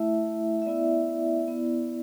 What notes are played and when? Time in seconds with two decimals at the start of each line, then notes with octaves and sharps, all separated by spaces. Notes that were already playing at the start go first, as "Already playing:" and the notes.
Already playing: A3 E4 E5
0.62 E5
0.66 B3 E4 D5
1.48 B3 E4